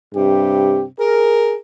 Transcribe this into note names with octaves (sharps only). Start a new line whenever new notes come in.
G2 C3 G4
G#4 A#4